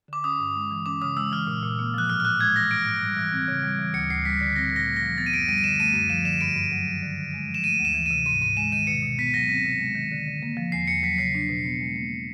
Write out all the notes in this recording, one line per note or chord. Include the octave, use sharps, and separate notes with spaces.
D3 D6
C#4 D#6
G2
G#3
E3
C#4 D6
C#3 D#6
G#3 E6
E3 F6
A#2
A#2
A#3
F3 F#6
A2 F6
F6
A2 F#6
G#3 G#6
E3 A#6
G#2 D7
G#2
G3
E3
C4
C#3
G3
E3
D2 C#7
D2 C7
G3 B6
D3 B6
C4 A#6
A#2 A#6
A3
A#6
F3
B3 A6
D#7
F#2 D7
G3 D#7
D#7
D3 E7
A3 D#7
F#2 D#7
F3 E7
D3 E7
G2 D7
G2
F#3
D#3
D3
D3
G#3
F3
E7
A3 D#7
D2
E7
E3
D#7
C3
G#2 D#7
G#2 D#7
G#3 E7
D#3 D#7
B2 C#7
B2
B3 B6
F#3 A#6
C4 B6
C3
G#3
D#3
D3
D3
A#3
F3
E2 C7
E2 C#7
F#3 B6
C#3 C7
D4
B2
B3
G#3
A#3